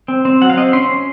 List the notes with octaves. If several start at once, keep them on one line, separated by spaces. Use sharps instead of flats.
C4
C4
F#3 F#5
F5
C4 D#5
C#4 C6
C#4